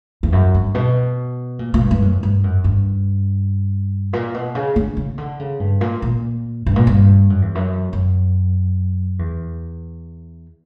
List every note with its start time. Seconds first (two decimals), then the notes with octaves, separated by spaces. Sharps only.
0.23 E2
0.33 F#2
0.54 G2
0.75 B2
1.59 A#2
1.74 A#2
1.80 G2
1.91 G2
2.02 F#2
2.23 G2
2.44 F#2
2.64 G2
4.13 A#2
4.34 B2
4.55 C#3
4.76 D3
4.97 C#3
5.18 D3
5.40 C#3
5.60 G2
5.81 A#2
6.02 A#2
6.66 G2
6.76 A#2
6.87 G2
7.30 F#2
7.42 E2
7.55 F#2
7.93 F#2
9.19 E2